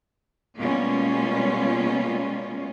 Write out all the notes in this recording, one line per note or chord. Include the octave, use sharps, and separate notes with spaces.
B2 G3 G#3 A#3 C#4 F4